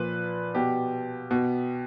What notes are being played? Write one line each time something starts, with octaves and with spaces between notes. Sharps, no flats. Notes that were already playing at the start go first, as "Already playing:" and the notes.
Already playing: A#2 F3 B4
B2 G4
B2